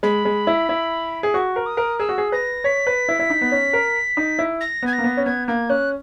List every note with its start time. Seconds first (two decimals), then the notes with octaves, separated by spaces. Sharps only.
0.03 G#3 B5
0.25 G#3
0.47 E4
0.69 E4
1.23 G#4
1.34 F#4 C#6
1.56 A#4
1.66 D#6
1.77 A#4
1.99 G#4 E6
2.09 F#4
2.18 G#4
2.32 B4 A#6
2.64 C#5 B6
2.87 B4
3.08 E4
3.19 E4
3.30 D#4
3.41 B3
3.52 C#4
3.73 A#4
4.17 D#4
4.39 E4
4.60 A#6
4.83 B3 G#6
4.93 A#6
4.98 A#3
5.04 B3
5.17 C#4
5.26 B3 G#6
5.48 A#3 G#6
5.69 C#4 F#6